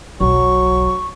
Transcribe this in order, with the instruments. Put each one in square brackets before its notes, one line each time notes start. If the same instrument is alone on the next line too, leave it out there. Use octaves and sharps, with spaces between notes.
[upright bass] E1 B1 [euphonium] F#3 [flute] C#6